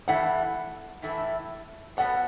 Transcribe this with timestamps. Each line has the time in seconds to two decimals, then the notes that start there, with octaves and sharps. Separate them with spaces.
0.08 A2 E3 A3 E4 F#5
1.02 A2 E3 A3 E4
1.97 B2 B3 F#4 A4 C#5 F#5